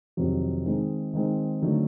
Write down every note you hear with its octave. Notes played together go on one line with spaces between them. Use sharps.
F2 C3 D#3 F#3
D#3 G#3 C4 D#4
D#3 G#3 C4 D#4
D3 F#3 A3 C4 D#4